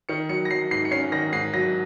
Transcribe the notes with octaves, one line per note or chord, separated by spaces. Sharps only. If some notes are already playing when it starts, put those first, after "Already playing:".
D#3 C#7
F#3 C#7
A#6
F#3 C7
G#2 C7
C#7
C#4 C7
D#3 A#6
G#2 C7
F#3 A#6